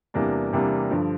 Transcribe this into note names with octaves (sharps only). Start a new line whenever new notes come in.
E2 C3 G3 A#3 D4
E2 C3 G3 A#3 D4
G2 D3 F3